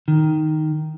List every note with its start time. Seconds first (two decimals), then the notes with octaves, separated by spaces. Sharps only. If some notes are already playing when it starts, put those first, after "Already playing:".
0.08 D#3